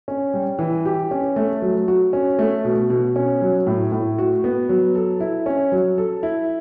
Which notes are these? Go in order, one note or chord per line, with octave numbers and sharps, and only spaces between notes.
C#4
G3
E3
G4
C#4
A3
F#3
F#4
C#4
A3
B2
B2
C#4
F#3
A2
A2
F#4
B3
F#3
A4
E4
C#4
F#3
A4
E4